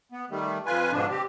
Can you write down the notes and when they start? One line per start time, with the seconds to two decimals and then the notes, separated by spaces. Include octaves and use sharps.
0.12 B3
0.30 D#3 G3 A3
0.66 F2 F4 B4 G#5
0.92 G#2 B2 D3 F3 D4
1.10 C4 G4